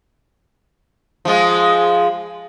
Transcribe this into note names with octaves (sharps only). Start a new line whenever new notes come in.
F3 G#3